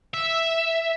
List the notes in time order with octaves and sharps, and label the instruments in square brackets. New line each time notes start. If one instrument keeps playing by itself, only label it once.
[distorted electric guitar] E5